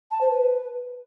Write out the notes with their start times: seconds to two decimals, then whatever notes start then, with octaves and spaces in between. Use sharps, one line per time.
0.11 A5
0.21 C5
0.31 B4